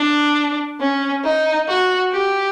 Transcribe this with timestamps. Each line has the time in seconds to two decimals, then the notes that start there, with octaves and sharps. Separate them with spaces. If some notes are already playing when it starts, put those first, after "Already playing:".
Already playing: D4
0.81 C#4
1.24 D#4
1.68 F#4
2.12 G4